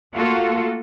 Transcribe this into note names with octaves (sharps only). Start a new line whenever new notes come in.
A3 A#3 F4 F#4 A4